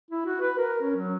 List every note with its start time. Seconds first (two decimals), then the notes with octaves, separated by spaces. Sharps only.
0.11 E4
0.26 F#4
0.41 B4
0.58 A#4
0.82 C#4
0.97 F#3